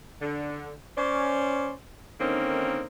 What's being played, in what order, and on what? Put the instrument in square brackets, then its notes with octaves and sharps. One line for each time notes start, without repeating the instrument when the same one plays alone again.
[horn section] D3
C#4 C5 D5
D3 D#3 A#3 C4 C#4 D#4